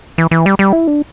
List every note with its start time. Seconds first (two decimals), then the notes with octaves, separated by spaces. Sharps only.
0.18 E3
0.31 E3
0.46 G3
0.59 G3
0.73 E4
0.87 D4